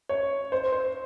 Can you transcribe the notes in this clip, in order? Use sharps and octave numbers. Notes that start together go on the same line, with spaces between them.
C#5
C5
C5